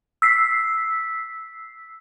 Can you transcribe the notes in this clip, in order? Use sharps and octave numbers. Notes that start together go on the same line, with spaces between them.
E6 B6 C7